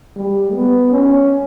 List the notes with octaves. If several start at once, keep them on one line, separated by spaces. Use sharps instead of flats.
G3
B3
C#4